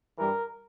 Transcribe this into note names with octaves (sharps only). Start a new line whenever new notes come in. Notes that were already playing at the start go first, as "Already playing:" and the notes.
G2 E3 G3 A#4